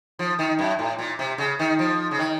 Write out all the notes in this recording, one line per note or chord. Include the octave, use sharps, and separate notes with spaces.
F3
D#3
F#2
A2
A#2
C3
C#3
D#3
F3
C#3
D#3